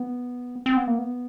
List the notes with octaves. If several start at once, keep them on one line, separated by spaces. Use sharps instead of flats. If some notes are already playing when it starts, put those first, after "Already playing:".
Already playing: B3
C4
B3
A#3
B3